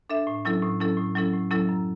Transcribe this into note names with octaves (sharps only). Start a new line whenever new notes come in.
D4 A4 E5
A2
F#3 C#4 E4 A4
A2
F#3 C#4 E4 A4
A2
F#3 C#4 E4 A4
A2
F#3 C#4 E4 A4
F#2